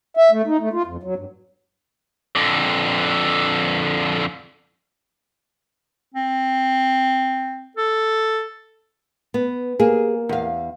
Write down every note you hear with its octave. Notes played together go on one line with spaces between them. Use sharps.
E5
A3
D#4
A3
F4
F2
F#3
G2
F2 D3
C4
A4
B3
A#3 G#4
E2 F5